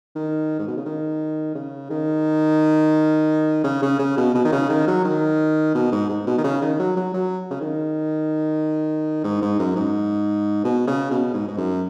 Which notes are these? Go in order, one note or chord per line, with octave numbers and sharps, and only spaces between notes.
D#3
G#2
B2
C#3
D#3
C#3
D#3
C#3
C#3
C#3
B2
B2
D#3
C#3
D#3
F#3
D#3
B2
G#2
G#2
B2
D#3
C#3
D#3
F#3
F#3
F#3
C#3
D#3
G#2
G#2
F#2
G#2
B2
C#3
B2
G#2
G#2
F#2